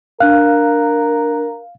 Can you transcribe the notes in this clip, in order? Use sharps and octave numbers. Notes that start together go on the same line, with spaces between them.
D4 A#4 F5 F#6